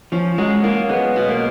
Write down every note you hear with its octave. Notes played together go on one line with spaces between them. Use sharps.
F3 C#4
F#3 G#3
A#3 F4
G#3 B3
B2
A#3